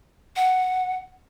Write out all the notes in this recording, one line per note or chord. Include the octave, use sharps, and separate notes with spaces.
F#5